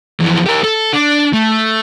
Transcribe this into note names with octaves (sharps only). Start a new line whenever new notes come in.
F2 E3
G4 A#4
A4
D4
A3